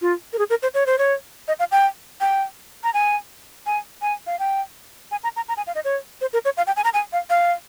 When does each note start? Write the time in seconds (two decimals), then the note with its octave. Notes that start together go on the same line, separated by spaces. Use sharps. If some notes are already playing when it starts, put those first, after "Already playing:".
0.02 F4
0.33 A#4
0.39 G#4
0.50 A#4
0.62 C5
0.74 C#5
0.86 C5
0.98 C#5
1.48 D#5
1.59 F5
1.72 G5
2.21 G5
2.84 A#5
2.94 G#5
3.66 G#5
4.02 G#5
4.27 F5
4.39 G5
5.11 G#5
5.24 A#5
5.36 A#5
5.48 A#5
5.57 G#5
5.67 F5
5.75 D#5
5.85 C#5
6.21 C5
6.33 A#4
6.45 C#5
6.57 F5
6.67 G5
6.76 G#5
6.84 A#5
6.94 G#5
7.13 F5
7.30 F5